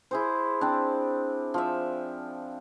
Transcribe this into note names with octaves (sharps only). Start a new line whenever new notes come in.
E4 G#4 C5
C4 D4
F3 D5 E5